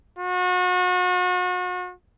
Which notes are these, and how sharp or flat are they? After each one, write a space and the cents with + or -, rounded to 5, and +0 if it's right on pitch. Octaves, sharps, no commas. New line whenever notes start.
F#4 -35